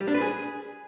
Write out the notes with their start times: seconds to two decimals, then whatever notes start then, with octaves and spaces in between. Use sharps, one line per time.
0.01 G3
0.07 D4
0.14 B4
0.21 G#4